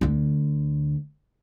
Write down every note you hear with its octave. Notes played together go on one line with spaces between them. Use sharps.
D2 D3